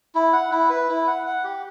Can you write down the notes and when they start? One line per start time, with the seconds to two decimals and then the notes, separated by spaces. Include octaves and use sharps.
0.15 E4
0.33 F#5
0.52 E4
0.70 B4
0.89 E4
1.07 F#5
1.27 F#5
1.44 G4